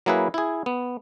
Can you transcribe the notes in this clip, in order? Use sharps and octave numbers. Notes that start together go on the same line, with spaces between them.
F#3 A#3 E4 G#4 B4
E4 G#4
B3